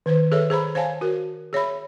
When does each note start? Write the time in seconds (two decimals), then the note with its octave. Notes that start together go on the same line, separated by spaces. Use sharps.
0.06 D#3 B4 C5
0.32 G#4 A4 B4 C#5 E5
0.50 G#4 C5 A#5 B5
0.75 C5 C#5 F5 G#5 A5
1.01 F#4 A#4
1.53 G#4 C#5 E5 B5